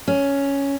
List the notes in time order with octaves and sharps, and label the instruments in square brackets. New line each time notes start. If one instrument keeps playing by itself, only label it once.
[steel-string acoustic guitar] C#4